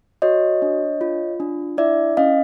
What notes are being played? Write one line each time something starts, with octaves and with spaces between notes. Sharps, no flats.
F#4 C#5 D#5
D4
F4
D4
E4 D5 E5
C#4 D#5 F5